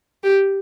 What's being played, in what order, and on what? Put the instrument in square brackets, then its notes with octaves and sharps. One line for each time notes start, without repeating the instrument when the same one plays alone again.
[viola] G4